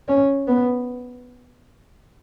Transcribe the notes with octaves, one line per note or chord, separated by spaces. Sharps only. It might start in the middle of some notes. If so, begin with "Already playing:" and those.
C#4
B3